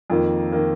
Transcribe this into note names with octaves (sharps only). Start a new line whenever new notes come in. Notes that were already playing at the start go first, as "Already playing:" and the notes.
F2 D#3 A#3
D#3 A#3